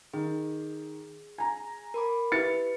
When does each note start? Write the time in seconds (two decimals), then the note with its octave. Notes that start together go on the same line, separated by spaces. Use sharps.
0.13 D#3 G#4
1.38 G#5 A#5
1.94 A#4 B5 D6
2.32 E4 G4 B4 A6 C#7